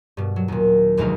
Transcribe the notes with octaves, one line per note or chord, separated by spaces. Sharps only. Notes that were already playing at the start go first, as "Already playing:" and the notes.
G2 B2
F#3
D#2 A#2
F1 D2 B2 G#3 D#4 F5